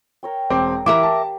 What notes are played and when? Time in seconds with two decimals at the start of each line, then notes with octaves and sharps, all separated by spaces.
0.23 A#4 C#5 G5
0.50 E1 C4 D6
0.86 E3 G4 A#4 E5 F5 D6
1.03 A5